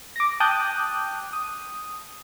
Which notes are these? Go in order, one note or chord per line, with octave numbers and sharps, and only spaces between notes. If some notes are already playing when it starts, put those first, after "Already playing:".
D6 A#6
G5 A5 D6 D#6 F#6 G6
D#6